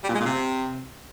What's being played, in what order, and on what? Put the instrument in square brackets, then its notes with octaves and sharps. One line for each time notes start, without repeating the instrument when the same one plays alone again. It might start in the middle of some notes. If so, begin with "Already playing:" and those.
[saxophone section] G3
A#2
G#3
A#2
C3